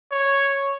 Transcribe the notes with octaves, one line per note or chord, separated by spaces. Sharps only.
C#5